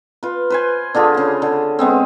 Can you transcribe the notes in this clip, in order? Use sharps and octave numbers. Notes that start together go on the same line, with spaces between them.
F4 B4
B4 C5 G#5
D3 D4 F4 G#4
C#3 G#4
D3
G#3 B3 C4